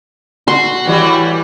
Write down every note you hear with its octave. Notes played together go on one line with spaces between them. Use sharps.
F#4 C6
A2 E3 G3